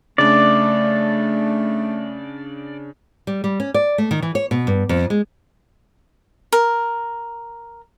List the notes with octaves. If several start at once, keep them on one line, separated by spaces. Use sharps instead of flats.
C#3 A3 D4 D5
G3
G3
C#4
D5
A3
D#3
E3
C#5
B2
G2
F2
G#3
A#4